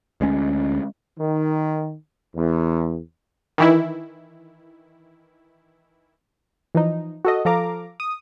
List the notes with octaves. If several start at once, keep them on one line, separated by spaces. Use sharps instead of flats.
D2 G#3 C#4
D#3
E2
D#3 E3 E4
E3 F3 D#4
F#4 A4 D#5
F3 A4 F5 A#5 D6
D#6